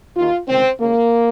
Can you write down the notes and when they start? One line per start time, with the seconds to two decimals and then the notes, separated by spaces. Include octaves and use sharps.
0.16 D#2 D#3 F4
0.48 C#2 C3 D#3 C4
0.80 C#2 C#3 A#3